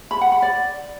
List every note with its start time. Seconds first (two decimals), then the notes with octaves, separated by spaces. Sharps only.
0.11 B5
0.21 F#5
0.32 B5
0.42 D5